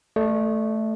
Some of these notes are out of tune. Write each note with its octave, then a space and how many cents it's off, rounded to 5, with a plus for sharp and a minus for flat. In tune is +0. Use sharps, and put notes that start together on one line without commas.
A3 +0 D5 +40